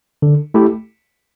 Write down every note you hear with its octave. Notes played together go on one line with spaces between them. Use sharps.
D3
A3 E4 G4